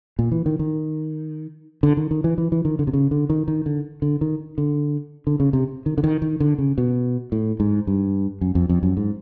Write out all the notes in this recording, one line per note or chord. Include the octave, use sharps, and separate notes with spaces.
A#2
E3
D#3
D#3
D3
D#3
D#3
E3
E3
E3
D#3
D3
C3
C#3
D3
D#3
D#3
D3
D3
D#3
D3
D3
C#3
C3
D#3
D3
D#3
D#3
D3
C#3
B2
A2
G#2
G2
F#2
F2
F2
F#2
G#2